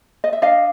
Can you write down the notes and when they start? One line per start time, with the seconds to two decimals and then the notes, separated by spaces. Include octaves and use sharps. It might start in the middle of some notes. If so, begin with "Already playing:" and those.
0.24 D#5
0.33 E5
0.42 D4 D#5 F5